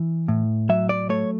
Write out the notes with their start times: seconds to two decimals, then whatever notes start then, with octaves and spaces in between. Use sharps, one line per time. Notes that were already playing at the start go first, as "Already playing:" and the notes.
Already playing: E3
0.28 A2
0.69 F#3 E5
0.89 D5
1.09 A3 C#5